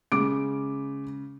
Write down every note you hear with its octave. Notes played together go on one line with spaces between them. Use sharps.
C#3 G#3 D6 D7